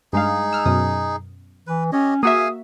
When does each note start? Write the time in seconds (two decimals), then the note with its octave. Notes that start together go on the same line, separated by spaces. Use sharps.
0.13 G2 G#3 D#4 G#4 F5
0.53 E6 F6
0.66 F#2 B2 D#6
1.67 E3 B4
1.92 C#4 G4 C#5 D#5
2.23 A#3 F#4 G#4 E5 F5 G#5 D#6